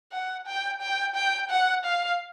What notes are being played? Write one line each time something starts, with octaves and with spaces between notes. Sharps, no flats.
F#5
G5
G5
G5
F#5
F5